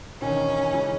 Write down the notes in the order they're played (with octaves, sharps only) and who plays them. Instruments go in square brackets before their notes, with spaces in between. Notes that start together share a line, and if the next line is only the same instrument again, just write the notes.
[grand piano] E1 D#2 D#3 [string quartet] C#4
[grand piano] C#3 E3 G#3